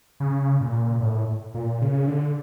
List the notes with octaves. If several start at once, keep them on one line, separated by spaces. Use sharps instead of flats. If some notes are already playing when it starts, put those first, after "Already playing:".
C#3
A#2
A2
A#2
C#3
D3